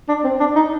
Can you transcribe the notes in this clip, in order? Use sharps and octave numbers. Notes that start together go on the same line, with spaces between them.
D4
C4
D4
D#4